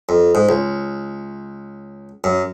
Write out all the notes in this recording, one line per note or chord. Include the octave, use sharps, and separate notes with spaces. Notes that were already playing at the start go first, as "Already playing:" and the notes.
F2
G#2
C#2
F#2